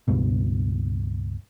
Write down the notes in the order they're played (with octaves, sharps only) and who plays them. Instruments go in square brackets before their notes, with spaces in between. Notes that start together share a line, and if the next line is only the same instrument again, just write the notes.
[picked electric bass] C#2 G2 B2